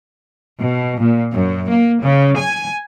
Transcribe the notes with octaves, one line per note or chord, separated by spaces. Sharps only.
B2
A#2
F#2
A#3
C#3
G#5